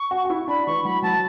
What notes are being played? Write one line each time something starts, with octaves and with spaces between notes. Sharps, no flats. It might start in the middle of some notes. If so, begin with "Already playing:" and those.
Already playing: C#6
F#4
F#4
E4
D4 B5
E3 C#6
F#3 B5
F#3 A5